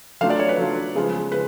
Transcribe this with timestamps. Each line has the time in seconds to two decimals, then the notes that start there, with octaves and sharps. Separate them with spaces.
0.21 F#3 A3 D4 F4 F5
0.30 D5
0.39 C#5
0.49 B4
0.58 F#3 A3 D4 F4
0.95 C#3 F3 G#3 B3 F4
1.32 C#3 B4